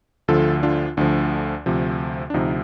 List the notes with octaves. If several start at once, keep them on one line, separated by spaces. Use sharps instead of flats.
D2 D3 F3 F4 A4
D4 F4
D2 D3 F3 D4
D2 C3 F3
D4
D2 C3 F3 D#4